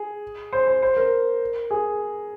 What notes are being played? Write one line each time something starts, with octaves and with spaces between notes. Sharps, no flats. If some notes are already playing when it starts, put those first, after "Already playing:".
Already playing: G#4
C5
C5
C5
A#4
G#4